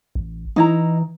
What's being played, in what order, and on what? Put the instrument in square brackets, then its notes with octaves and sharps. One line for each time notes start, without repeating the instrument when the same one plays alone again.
[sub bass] A1
[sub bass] E3 [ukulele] D#4 E4 A#5